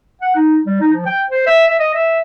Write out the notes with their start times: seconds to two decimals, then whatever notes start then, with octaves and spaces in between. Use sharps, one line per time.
0.21 F#5
0.35 D#4
0.66 G3
0.80 D#4
0.93 F3
1.06 G5
1.30 C5
1.47 E5
1.68 E5
1.79 D#5
1.94 E5